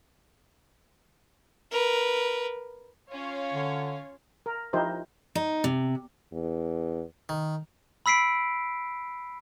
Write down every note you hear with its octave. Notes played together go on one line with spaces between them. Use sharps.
A#4 B4
C#4 F4 C#5 F5
D3
A#4
F3 D#4 E4 G4 A#4 C5
D#4
C3
E2
D#3
B5 E6 B6 C7 D7